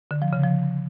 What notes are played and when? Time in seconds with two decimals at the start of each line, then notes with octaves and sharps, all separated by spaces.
0.11 D3
0.22 F3
0.33 C#3
0.44 F3